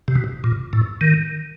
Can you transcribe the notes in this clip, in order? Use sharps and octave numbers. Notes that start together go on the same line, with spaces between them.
C3
B2
A#2
A2
D#3